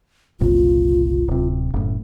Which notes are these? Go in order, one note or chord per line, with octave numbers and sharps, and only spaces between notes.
F#1 C2 A#2 F4
D1 C3
F#1 A2